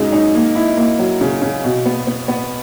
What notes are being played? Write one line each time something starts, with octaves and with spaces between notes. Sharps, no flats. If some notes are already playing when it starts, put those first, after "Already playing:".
Already playing: F#2 C#3 G#3 D#4
D#4
A#3
E4
A#3
F#3
C#3
C#3
B2
B3
B3
B3